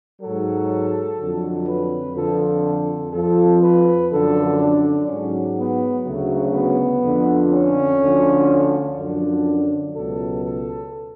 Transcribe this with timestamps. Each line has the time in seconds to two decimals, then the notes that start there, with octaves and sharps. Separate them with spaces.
0.21 G#2 F#3 A4
1.18 F2 D3 F#3
1.67 B4
2.15 F2 D3 F3 A4
2.65 A4
3.13 F2 F3 A4
3.62 B4
4.10 F#2 D3 F3 A4
4.59 D4
5.08 G#2 F#3 C#4
5.56 B3
6.05 D2 C#3 F#3 A3
6.53 B3
7.02 F2 D3 F3
7.51 C#4
8.00 D2 D3 F3
8.97 F#2 D3 F3 D4
9.94 C#2 B2 F#3 A4
10.43 A4